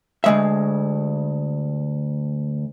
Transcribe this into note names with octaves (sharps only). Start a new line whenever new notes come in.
D2 G#3 E5